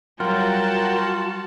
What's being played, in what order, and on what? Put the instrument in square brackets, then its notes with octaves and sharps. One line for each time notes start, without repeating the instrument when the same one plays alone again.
[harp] F#3 G3 [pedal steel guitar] F4 [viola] F#4 A5 [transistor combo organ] A#4 F#5 G5